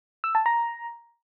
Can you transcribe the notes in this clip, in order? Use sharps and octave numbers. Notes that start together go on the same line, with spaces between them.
E6
A5
A#5